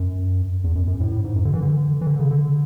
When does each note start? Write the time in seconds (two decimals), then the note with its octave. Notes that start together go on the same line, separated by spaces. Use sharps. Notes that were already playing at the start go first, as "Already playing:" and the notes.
Already playing: F#2
0.64 E2
0.75 F#2
0.88 F#2
1.00 A2
1.12 A2
1.24 G#2
1.36 F#2
1.45 D3
1.54 E3
1.62 D3
2.01 E3
2.07 D3
2.20 C#3
2.31 D3